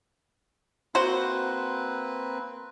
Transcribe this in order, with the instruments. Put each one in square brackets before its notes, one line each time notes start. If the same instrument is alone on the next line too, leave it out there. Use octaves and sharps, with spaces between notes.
[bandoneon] A#3 C4 B4 [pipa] F#4 C5